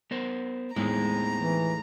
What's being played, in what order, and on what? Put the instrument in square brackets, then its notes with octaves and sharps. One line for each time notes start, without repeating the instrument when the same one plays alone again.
[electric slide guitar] B3 A#4 C5
[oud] D#2 A2 G#3 [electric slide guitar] B3 C4 E4 [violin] A#5
[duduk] E3